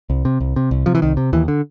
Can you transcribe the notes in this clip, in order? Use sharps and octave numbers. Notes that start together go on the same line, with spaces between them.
C2
C3
C2
C3
C2
C3 F3
E3
C2 D#3
C3
D#2 E3
D3